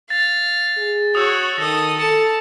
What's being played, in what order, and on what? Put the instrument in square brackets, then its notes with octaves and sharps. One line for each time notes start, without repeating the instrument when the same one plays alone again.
[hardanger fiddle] F5 [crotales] A6
[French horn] G#4
[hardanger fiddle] F#4 C#5 [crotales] D#6 E6
[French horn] D#3 [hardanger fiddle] A4 D#6 [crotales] A#6
[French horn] A4 [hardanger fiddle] A5 [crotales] C#7